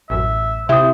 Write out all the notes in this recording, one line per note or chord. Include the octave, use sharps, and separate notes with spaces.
A1 F#2 E5
C3 E4 G4 C5 E5 D#6